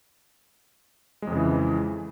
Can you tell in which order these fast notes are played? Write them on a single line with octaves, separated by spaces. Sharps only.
G#3 F2 C#3 E3